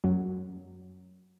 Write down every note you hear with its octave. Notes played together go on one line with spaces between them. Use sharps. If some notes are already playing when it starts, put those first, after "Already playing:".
F#2 F#3